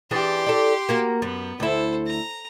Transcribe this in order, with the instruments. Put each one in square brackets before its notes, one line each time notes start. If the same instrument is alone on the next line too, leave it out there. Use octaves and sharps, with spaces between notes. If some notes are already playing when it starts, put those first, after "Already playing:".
[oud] E3 D4 G#4 [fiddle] G4 C6
[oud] A4 D5
A#3 F#4 A#4
[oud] F#2 [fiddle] B3
[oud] D2 E4 [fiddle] A4 C5
[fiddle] A#5